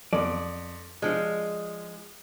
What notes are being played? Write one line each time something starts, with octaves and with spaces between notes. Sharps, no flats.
F2 D5
F3 G#3 D4